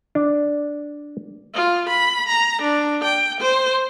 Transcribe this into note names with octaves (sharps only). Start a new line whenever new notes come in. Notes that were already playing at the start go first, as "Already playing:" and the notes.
D4
F4
B5
A#5
D4
G5
C5